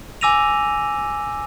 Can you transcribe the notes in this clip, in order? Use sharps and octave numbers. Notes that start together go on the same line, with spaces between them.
G#5 D6 E6 A#6 D#7 F7